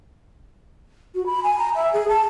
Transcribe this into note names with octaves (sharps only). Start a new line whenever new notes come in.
F#4
B5
G#5
A#5
E5
G#4
A5